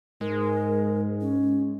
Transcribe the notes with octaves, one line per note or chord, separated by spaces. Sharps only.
G#2 G#3 A#4
C#4